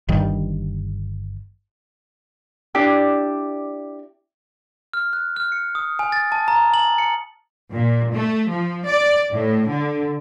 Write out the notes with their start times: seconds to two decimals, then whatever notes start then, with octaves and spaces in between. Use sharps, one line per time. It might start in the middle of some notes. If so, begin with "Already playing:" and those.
0.09 G1 G2 D#3 G3
2.75 D4 E4 G4 D5
4.93 F6
5.13 F#6
5.36 F6
5.52 C#7
5.75 D#6
5.99 G#5
6.12 A6
6.32 A5
6.48 A#5
6.74 F#7
6.98 C#7
7.73 A#2
8.13 A3
8.49 F3
8.86 D5
9.33 A2
9.68 D3